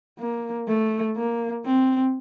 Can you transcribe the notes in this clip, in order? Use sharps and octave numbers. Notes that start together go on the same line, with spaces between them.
A#3
A3
A#3
C4